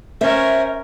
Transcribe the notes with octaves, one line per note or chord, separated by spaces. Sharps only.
C#4 A#4 C5 E5